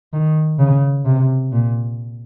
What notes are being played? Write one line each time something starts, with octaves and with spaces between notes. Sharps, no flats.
D#3
C#3
C3
A#2